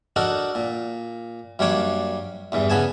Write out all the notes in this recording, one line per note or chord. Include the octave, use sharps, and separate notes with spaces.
D4 D#4 F#4 A4 A#4
A#2
F#2 G3 A#3 D4 C#5 D6
E2 G2 E3
C#3 B3 G#5 A5